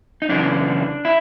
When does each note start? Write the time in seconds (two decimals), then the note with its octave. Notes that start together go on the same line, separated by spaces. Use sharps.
0.22 D#4
0.29 F#2 C#3 E3 D4
1.05 E4